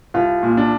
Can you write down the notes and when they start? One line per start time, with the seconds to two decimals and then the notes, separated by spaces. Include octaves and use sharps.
0.14 C2 F4
0.43 A#2
0.57 D4